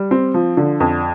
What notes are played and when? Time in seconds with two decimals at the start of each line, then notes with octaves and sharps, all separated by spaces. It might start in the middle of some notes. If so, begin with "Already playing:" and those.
Already playing: G3
0.11 C4
0.34 F3
0.57 D3
0.80 F2